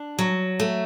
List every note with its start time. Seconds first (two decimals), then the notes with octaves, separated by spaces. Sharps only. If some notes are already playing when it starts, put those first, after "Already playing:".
Already playing: D4
0.19 F#3
0.60 A3